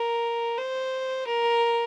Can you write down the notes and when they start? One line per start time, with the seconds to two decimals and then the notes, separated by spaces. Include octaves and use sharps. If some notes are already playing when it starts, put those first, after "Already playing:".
Already playing: A#4
0.58 C5
1.27 A#4